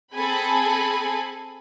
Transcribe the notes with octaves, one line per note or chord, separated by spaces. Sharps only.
C4 G#4 A4 G#5 B5